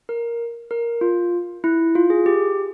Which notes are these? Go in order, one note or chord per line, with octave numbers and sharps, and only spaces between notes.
A#4
A#4
F4
E4
F4
G#4
G4